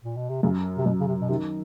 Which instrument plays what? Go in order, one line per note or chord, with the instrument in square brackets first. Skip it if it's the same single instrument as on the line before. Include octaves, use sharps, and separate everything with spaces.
[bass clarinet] A#2
B2
C3
[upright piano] F#2 [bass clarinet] C#3
[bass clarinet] C3
[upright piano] F#2 [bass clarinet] B2
[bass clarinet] C#3
C3
B2
[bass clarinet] C3 [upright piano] D#3